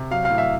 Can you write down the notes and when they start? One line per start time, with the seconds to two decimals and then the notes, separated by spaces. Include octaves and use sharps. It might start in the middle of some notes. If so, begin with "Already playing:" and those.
Already playing: C3
0.11 F#3 F5
0.25 F5
0.30 A2
0.38 E5